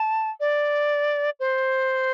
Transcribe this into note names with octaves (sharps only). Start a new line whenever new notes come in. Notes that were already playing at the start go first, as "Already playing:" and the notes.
Already playing: A5
D5
C5